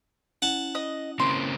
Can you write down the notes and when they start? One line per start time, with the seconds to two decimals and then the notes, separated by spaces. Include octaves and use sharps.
0.42 C#4 E4 F#5 A5
0.75 D#5
1.20 C#3 A#3 C4 C6